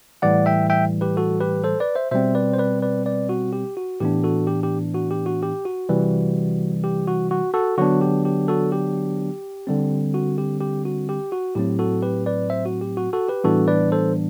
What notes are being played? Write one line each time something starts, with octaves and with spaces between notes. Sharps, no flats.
A2 E3 G3 D5 F#5
E5 G5
E5 G5
G4 B4
F#4 A4
G4 B4
A4 C5
B4 D5
C5 E5
B2 G3 C4 C5 E5
B4 D5
C5
B4 D5
B4 D5
B4 D5
F#4
G4
F#4
A2 E3 B3 D4 G4
F#4 A4
G4
G4
F#4
G4
F#4
G4
F#4
C3 E3 G3
G4
F#4
F#4
F#4 A4
D3 F#3 B3 D4 F#4
G4
G4
F#4 A4
G4
D3 G3 C4
F#4
G4
G4
F#4
G4
F#4
A2 F#3 C4 G4
F#4 A4
G4 B4
B4 D5
C5 E5
F#4
G4
F#4
F#4 A4
G4 B4
A2 E3 G3 B3 D4 F#4 A4
B4 D5
A4 C5